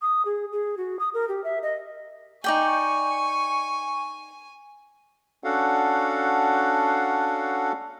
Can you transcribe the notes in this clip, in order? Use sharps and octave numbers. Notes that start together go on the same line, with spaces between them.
D#6
G#4
G#4
F#4
D#6
A#4
G4
E5
D#5
D#4 D5 G5 G#5 C#6
C#4 D4 F#4 A4 F5 F#5